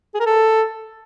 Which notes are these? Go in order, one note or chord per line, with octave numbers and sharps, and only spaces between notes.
G#4
A#4
A4